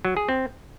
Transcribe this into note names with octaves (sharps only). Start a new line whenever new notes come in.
F#3
G#4
C4